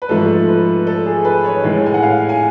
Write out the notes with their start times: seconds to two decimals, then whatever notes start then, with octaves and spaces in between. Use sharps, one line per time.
0.02 B4
0.09 G#2 F3 A3 A4
0.48 B4
0.87 A4
1.06 G#4
1.25 B4
1.45 C#5
1.63 A2 G#3
1.86 G#5
1.94 F#5
2.02 F5
2.29 G#5